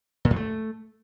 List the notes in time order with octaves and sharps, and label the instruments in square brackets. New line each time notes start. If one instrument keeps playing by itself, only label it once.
[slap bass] A#2
F2
A3